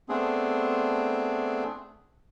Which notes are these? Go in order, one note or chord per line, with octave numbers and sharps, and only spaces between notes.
A3 B3 C4 D4 G#4